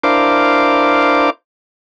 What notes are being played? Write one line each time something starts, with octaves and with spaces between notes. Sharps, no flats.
D4 E4 A#4 C5 F5 D6